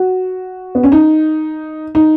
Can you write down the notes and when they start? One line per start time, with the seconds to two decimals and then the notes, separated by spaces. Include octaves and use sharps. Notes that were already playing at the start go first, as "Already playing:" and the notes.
Already playing: F#4
0.75 B3
0.83 C#4
0.92 D#4
1.95 D#4